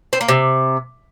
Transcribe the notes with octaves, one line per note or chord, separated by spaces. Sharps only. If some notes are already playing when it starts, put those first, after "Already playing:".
C4
A#3
C3